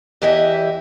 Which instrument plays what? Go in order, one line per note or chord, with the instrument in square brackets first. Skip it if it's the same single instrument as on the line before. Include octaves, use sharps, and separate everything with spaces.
[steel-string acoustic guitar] E2 E3 E4 G4 D#5 E5